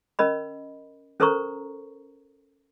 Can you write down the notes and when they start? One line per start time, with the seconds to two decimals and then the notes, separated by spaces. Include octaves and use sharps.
0.19 C#4 A#4 D#5 B5
1.20 C#4 A4 A#4 C5 A#5 C#6